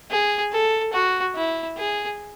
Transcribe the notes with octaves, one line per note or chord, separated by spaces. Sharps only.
G#4
A4
F#4
E4
G#4